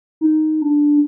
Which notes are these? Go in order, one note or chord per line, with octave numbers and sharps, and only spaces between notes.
D#4
D4